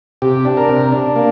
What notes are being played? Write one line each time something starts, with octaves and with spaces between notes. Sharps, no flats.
C3 G4
D4
A#4
C3
D4
A#3